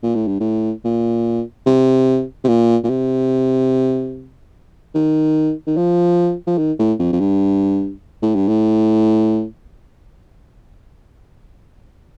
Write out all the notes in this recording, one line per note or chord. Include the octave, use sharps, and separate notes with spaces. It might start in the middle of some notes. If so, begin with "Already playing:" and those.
A#2
A2
G2
A2
A#2
C3
C3
A#2
A#2
C3
D#3
D#3
F3
F3
D#3
A2
F2
F2
G2
A2
G2
A2